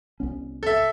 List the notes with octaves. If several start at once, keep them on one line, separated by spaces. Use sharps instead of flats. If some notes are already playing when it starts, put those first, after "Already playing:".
C2 B3 C#4
A4 E5